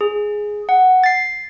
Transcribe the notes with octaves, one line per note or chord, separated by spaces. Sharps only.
G#4
F#5
A6 C7